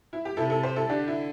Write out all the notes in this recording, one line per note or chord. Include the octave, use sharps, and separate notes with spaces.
E4
G4
C3 E4 A4
E4 A4
G4 C5
E4 A4
D3 D4 G4
E4